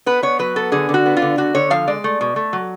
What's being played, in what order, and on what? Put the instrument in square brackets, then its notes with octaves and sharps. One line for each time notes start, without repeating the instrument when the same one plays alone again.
[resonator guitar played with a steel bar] B3 B4
B3 C#5
F#3 B4
B3 A4
D3 G#4
D3
F#4
B3
F4
D3
D3 F#4
D3 C#5
F3 F5
G#3 D5
A3
B2
A3
F#3